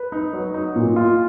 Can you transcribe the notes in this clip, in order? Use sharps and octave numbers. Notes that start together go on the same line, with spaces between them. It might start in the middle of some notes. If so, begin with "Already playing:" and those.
Already playing: B4
D#4
F#3
D#4
A#2
F4